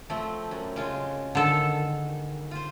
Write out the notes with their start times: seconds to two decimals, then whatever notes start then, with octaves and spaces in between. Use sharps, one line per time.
0.10 F3 A3 C4
0.51 F#2
0.76 C#3 G#3 F4
1.35 D3 D#3 A4
2.51 F4 C5